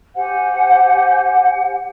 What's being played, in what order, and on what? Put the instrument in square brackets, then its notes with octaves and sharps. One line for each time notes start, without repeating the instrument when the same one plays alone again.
[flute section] G4 C5 F#5 G#5